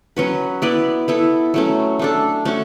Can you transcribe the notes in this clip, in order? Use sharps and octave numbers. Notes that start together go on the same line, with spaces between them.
F#3 C#4 F#4 B4
B3 E4 B4 D5
B3 E4 A4
F#3 A3 C#4
A3 D4 A4
A3 C#4 F#4